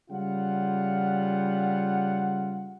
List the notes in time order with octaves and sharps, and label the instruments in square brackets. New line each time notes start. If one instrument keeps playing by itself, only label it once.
[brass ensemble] C#3 G3 F4 F#5